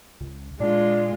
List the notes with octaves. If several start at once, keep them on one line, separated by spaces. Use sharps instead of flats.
C#2
A#2 G#3 D4 F4